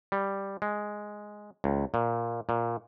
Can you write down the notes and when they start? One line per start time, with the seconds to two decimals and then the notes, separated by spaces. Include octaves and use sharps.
0.12 G3
0.62 G#3
1.64 C#2
1.94 A#2
2.49 A#2